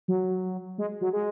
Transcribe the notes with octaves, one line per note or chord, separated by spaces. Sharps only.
F#3
G#3
F#3
G#3